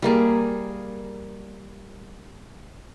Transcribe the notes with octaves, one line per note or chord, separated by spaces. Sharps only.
G3 A#3 G#4